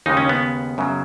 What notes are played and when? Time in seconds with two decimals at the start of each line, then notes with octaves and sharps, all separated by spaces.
0.06 D#2 C#3 G#3 D#4
0.17 C#4
0.29 B3
0.78 F#2 C#3 F#3